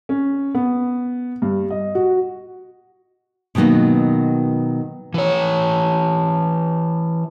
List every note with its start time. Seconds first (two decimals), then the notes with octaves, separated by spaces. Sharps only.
0.09 C#4
0.55 B3
1.42 G2
1.70 D#5
1.95 F#4
3.55 B2 D#3 F#3 A#3 B3
5.14 E3 C#5